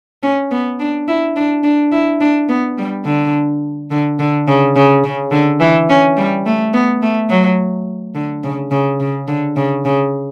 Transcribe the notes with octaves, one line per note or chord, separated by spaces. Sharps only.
C#4
B3
D4
E4
D4
D4
E4
D4
B3
G3
D3
D3
D3
C#3
C#3
C#3
D3
E3
C#4
G3
A3
B3
A3
F#3
D3
C#3
C#3
C#3
D3
C#3
C#3